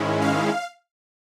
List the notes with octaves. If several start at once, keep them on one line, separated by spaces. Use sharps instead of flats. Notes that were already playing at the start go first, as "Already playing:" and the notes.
Already playing: G#2 D#3 G#3 C#4 E4
F5